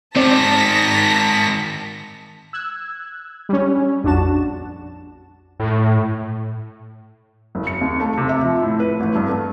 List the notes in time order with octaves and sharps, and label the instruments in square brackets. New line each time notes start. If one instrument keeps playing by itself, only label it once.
[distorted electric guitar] G#2 D#3 [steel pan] C4 D5 [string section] A5 A#6 B6
[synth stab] E6 F#6 G#6
G3 C#4
A#1 F2 D4 F#4 A5 E7
[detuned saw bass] A2
[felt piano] F#1
C#7
D#2
A3
C3
E5
F3
A2
B4
A1
G2
A3